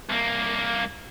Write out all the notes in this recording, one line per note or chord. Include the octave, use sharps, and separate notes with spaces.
C2 A#3